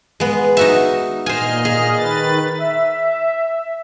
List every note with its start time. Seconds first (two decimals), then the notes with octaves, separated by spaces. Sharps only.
0.20 G#3 B3
0.57 D#4 F#4 E5
1.26 A#2 C5 D#5 G#5 F6
1.65 G#4
1.97 D#3 B4 A6
2.59 E5